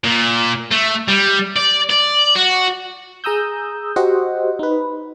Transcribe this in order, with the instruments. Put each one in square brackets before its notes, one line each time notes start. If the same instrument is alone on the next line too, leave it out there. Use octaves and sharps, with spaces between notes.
[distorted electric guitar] A#2
A3
G3
D5
D5
F#4
[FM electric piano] G#4 A#5 D#6 E6 G6
F#4 G4 C5 D#5 F#5
D#4 B4